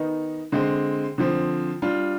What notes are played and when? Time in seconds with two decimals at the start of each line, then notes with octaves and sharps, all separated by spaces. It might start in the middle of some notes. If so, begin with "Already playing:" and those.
Already playing: D#3 B3 D#4
0.52 D3 G#3 C4
1.18 D3 F3 C4
1.82 G3 D4 F4